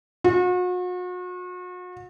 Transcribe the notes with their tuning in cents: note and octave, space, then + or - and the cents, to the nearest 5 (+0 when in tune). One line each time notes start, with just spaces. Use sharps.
F#4 -40